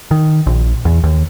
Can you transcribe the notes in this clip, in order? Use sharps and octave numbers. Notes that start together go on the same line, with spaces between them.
D#3
A#1
E2
D#2